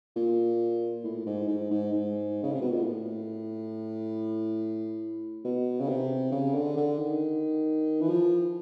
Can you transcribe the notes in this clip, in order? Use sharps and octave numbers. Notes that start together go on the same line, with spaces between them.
A#2
A2
G#2
G#2
G#2
G#2
C#3
C3
B2
A#2
A2
B2
C#3
C3
C#3
D3
D3
D#3
E3
F3